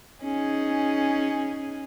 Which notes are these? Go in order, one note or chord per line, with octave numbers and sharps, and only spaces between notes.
C#4 D#4 G#4